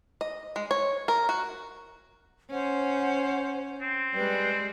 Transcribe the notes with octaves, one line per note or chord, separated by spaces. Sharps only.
D#5
G#3
C#5
A#4
F#4
C#4 C5 F#5
C4
G3 G#3 B4